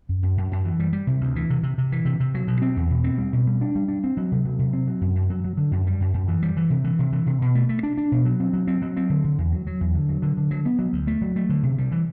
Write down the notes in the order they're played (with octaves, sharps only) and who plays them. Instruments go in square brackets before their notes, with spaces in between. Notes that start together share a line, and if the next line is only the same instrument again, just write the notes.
[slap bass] F#2
F#2
F#2
F#2
E3
G3
G3
C3
D2
E3
C3
C3
C3
E3
C3
C3
F#3
B2
C4
E2
B2
C4
G3
B2
G3
D4
G3
D4
C4
F#3
C3
F#3
C3
C4
F#3
F#2
F#2
F#3
F#3
D3
F#2
G3
F#2
F#2
E3
G3
E3
C3
E3
C3
E3
C3
B2
A3
A3
D4
D4
B2
F#3
C4
F#3
C4
F#3
C4
D3
D3
E2
F#3
F#3
E2
D3
F#3
D3
D3
F#3
B3
F#3
D2
A3
F#3
A3
D3
C3
G3
E3